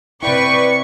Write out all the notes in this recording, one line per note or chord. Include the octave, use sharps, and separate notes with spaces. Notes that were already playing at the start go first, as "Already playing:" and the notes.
C3 E4 B4 D5 G5 C#6